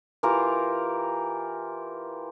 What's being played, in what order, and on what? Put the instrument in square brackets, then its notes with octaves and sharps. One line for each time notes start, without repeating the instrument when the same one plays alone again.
[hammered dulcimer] E3 F4 G4 A#4